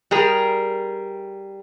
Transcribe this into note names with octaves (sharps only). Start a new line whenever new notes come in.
G3 G#4 A#4